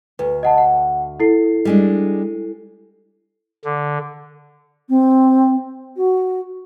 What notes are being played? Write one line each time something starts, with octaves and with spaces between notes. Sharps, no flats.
D2 B4
D#5 F#5 A5
F#5
E4 A4 C7
G3 G#3 D4
D3
C4
F#4